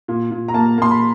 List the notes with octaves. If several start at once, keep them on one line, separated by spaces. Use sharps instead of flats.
A#2
A#2
A#5
A#3 A5
A#3 C6
B5